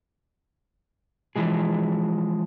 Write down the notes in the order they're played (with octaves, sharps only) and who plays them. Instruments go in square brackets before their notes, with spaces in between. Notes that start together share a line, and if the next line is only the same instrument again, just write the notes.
[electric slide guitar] E3 F3 G#3 G#4